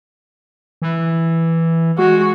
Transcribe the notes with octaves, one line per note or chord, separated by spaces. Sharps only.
E3
G#3 F#4